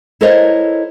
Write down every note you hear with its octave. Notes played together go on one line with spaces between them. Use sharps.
E4 A4 A#4 C5 C#5 D#5